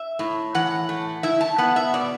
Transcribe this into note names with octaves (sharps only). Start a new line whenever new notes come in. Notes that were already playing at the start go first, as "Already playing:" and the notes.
Already playing: E5
A2
E3 F#5
A3
E4 E5
A5
B3 F#5
E5
B2 D5